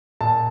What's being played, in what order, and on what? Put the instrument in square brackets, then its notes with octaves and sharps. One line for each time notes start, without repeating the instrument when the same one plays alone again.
[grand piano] A#2 A5